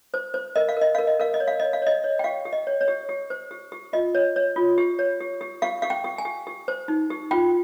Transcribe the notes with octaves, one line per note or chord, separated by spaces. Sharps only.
C5
C5
A#4 D#5
F5
A#4 D#5
A#4 F5
D#5
A#4 F5
D#5
C#5
F5
C#5 D#5
F5
C#5 D#5
C#5
G5
G4 F5
G4
D#5
C#5
C#5
G4
G4
C5
G4
G4
F4 D#5
C#5
C#5
F4
G4
C#5
G4
G4
G4 F5
G4 F5
G5
G4
G#5
G4
G4
C5
D#4
G4
F4 G5